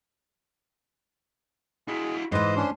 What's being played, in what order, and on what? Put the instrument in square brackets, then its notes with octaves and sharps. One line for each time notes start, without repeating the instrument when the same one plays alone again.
[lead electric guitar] E4 F#4 [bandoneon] G#4
[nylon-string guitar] G#2 E3 [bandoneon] B4 D#5 [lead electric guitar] C5
[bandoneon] C#4 D4 C6